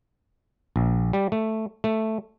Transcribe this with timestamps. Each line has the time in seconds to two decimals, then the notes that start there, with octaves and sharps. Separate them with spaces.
0.76 A#1
1.13 G3
1.32 A3
1.84 A3